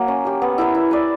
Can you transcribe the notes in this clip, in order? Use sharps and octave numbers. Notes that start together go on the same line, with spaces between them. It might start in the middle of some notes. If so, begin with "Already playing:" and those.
Already playing: F#3 A#3
C#4
G4 A#4
B3
E4 A#4 E5
E4
B4 D5